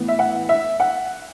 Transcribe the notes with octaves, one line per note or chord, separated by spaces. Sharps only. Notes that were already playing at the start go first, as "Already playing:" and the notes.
Already playing: A2 E3 B3
E5
F#5
E5
F#5